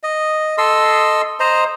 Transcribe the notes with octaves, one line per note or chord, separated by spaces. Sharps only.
D#5
A4 D#5 C6 E6
C5 D#5 A#5